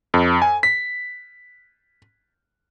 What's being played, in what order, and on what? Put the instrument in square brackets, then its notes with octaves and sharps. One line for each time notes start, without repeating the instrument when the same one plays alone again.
[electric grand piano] F2
G#5
B6